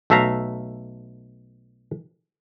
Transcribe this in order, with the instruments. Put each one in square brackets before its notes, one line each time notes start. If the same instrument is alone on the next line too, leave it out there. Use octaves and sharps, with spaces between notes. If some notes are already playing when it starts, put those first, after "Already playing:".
[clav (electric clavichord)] B1 A3 E5 F5 A#5